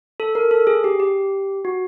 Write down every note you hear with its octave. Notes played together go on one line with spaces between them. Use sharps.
A4
A#4
A4
G#4
G4
G4
F#4